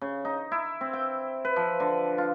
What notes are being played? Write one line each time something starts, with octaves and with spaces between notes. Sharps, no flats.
C#3
D#4
E4
C4
G5
B4
F3
D3
F4